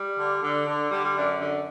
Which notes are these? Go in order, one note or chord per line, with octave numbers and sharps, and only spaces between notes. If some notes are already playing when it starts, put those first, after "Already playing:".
Already playing: G3
D3
D3
D3
D3 G3
G3
F#2 D4
D3